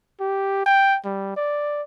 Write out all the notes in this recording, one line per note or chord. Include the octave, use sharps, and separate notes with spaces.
G4
G5
G3
D5